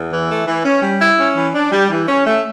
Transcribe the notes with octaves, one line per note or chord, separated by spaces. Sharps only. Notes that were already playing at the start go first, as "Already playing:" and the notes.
Already playing: E2
E3
A3
E3
C#4
G3
E4
C#4
E3
D4
G3
E3
C#4
A3